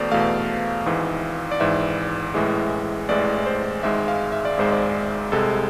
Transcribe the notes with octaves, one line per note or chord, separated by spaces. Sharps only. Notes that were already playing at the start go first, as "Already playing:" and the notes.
Already playing: E2 B2 A3 A4 C5 D5
E2 B2 A3 F5
G#1 G#2 E3
D5
G#1 G#2 E3 E5
A1 A2 E3 G#3
A1 A2 E3 G#3 D5
C5
G#1 G#2 G#3 E5
F5
E5
D5
G#1 G#2 G#3 C5
D5
C2 C3 G#3 A4